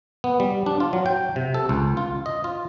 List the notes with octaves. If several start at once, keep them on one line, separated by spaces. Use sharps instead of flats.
B3
G3
D4
F4
F#3
G5
C3
A4
C#2
F4
D#5
F4